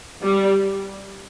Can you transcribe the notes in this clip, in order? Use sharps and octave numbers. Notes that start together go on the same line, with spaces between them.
G3